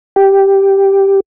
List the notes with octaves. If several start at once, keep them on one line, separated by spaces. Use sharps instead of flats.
G4